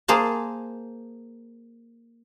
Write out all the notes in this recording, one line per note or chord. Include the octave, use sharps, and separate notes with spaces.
A#3 G#4 C5 A5